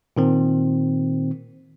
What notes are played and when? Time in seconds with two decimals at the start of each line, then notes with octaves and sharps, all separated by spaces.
0.17 A#2 D#3 C4